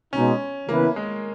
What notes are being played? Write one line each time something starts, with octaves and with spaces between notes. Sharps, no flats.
B2 G#3 C#4 D#4
C#3 E3 A#3 B3 E4 B4
G#3